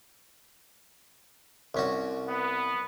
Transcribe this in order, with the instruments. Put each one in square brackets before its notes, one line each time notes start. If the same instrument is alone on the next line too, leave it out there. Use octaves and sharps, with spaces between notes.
[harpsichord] C2 C#4 F#4
[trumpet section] B3